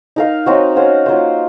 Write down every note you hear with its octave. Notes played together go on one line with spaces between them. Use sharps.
D#4 A#4 F5
F#3 C4 D#4 F#4
C#4 F#4 C5 F5
F#3 A#3 F4 C5